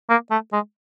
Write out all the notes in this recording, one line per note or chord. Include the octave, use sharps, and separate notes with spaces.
A#3
A3
G#3